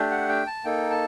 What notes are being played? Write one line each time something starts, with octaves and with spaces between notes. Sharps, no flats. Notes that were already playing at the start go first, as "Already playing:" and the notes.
Already playing: A3 D4 G4
F#5
G5
A5
A#3 D#4 A4 G5
A5